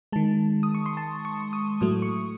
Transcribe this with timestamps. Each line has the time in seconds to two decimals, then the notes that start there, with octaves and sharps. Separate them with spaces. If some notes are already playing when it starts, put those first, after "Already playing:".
0.12 D#3 G#3 A5
0.63 D#6
0.74 C#6
0.86 C6
0.97 A5
1.25 C#6
1.53 D#6
1.81 A2 F#3 A3 D#6
2.02 C#6